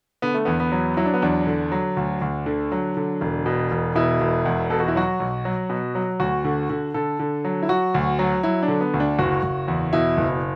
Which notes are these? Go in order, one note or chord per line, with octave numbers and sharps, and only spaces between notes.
D3 B3
A3
E2 B3
B3
F#3
F#3 E4
D4
B3
E2 D4
D3
F#3
D2
D2
D3
F#3
D3
E1
B2
E1
B2 E4
E1
E2
B2 A4
F#4
E4
F#3 F#4
B1
F#3
B2
F#3
D2 F#4
D3
D3
D3 A4
D3
F#3
E4
F#3 F#4
D2
F#3
F#3 E4
D4
D3
B3
D2
D4
F#1 F#4
F#1
E2
B2 E4
F#1